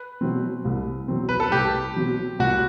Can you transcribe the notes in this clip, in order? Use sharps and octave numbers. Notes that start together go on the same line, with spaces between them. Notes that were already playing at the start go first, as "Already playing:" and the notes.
Already playing: B4
B2 F#3 C4
C2
B2 F#3 C4
B4
A4
C2 G4
B2 F#3 C4
C2 F#4